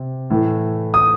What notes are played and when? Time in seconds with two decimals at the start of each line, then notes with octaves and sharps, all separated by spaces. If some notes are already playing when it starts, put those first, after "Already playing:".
Already playing: C3
0.30 A2 E3 A3
0.94 D#6